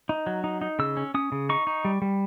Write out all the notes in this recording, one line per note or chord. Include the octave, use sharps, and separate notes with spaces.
D#4
F#3
D#4
D#4
C#3 E6
C#4
C#4 D#6
C#3
D#4 C#6
D#4
G3
G3